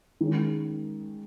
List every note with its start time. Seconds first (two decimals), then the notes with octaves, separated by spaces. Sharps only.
0.21 D#3 G#3 C#4